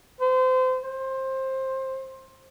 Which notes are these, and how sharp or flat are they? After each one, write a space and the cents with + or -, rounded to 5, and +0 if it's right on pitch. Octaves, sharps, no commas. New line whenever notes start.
C5 -30
C5 +20